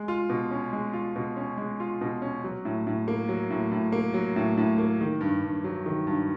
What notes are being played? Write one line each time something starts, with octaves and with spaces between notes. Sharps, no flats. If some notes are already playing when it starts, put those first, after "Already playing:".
Already playing: G#3
F4
B2
C#4
G#3
F4
B2
C#4
G#3
F4
B2
C#4
F#3
A2
A2
A#3
F#3
A2
A2
A#3
F#3
A2
A2
A#3
D#3
G2
G2
F#3
D#3
G2